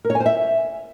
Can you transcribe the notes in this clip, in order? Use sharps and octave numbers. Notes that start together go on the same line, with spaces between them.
A#4
C#5
G#5
C5
E5